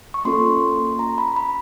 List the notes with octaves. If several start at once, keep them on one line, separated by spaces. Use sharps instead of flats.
C#6
A#3 C#4 F4 A4 C6
A#5
B5
B5